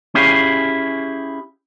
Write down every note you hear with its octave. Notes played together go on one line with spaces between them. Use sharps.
C#4 E4 G4 G#4 F5